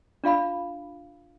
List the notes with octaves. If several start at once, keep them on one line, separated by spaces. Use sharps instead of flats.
D4 F4 F5 B5